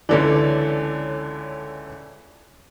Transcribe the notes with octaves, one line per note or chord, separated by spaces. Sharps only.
C#2 D3 E3 C#4 A4 D5